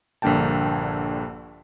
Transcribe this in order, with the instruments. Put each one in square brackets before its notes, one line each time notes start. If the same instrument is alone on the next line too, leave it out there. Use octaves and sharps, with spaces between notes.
[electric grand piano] A#1 G2 D3 A#3 G5 A5